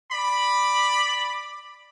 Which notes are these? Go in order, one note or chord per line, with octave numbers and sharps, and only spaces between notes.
D5 B5